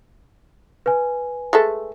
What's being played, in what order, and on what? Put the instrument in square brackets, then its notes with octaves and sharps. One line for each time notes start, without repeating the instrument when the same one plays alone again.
[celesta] B4 G#5
[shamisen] G#3 A3 A4